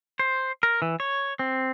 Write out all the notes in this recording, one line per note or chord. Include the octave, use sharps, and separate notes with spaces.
C5
A#4
E3
C#5
C4